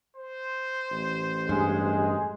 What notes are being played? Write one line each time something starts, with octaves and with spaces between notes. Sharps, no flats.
C5
A1
G2 G#3